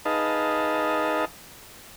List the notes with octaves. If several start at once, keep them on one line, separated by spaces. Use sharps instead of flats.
D#4 G#4 B4 D#5 F5 A5